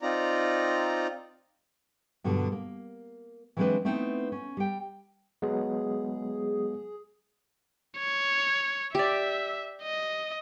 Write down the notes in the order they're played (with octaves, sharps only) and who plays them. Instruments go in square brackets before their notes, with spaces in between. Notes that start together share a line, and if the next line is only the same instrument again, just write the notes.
[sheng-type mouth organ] C4 D#4 F4 D5 A#5
[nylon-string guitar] G2 B2 D3 F#3 G3
A#3
E3 F#3 G#3 C4 D4 B4
A3 B3 C4 D#4 E4
C#4
G3 G5
[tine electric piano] F#3 G#3 B3 [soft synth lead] G#4
[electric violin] C#5
[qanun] G4 D5 [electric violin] E5
[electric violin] D#5